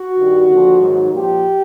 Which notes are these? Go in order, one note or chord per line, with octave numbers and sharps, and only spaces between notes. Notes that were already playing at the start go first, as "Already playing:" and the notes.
Already playing: F#4
G2 D#3 G3
D#2 D3 F3
G#2 D#3 F#3
A#2 F3 G4